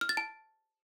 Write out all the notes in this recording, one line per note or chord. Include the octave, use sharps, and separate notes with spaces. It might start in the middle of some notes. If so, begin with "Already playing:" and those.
F6
A6
A5